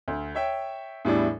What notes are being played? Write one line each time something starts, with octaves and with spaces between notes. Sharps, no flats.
D2
C#5 E5 G5
E2 A2 G3 D4 E4